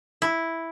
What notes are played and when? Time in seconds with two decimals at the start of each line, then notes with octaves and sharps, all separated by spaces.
0.22 E4